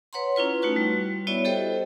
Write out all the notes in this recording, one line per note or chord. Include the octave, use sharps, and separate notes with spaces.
B4 C#5 F#5 A#5 C6
C#4 E4 F4 B4
A3 D#4 F#4 B4
G3
B3 E4 F#4 C#5 D5 E5
G4 A4 C5 D#5 G5